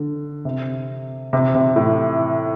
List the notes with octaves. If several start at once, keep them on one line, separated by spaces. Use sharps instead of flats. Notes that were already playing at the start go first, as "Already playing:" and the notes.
Already playing: D3
C3
C3
C3
A2